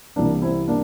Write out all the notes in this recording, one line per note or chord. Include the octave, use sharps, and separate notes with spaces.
C2 C3 E3 A#3 D4
C4 E4
A#3 D4